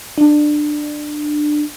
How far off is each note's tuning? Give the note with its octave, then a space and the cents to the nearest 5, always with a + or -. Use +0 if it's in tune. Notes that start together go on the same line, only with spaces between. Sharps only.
D4 +20